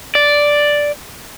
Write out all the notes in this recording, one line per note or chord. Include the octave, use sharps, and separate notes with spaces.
D5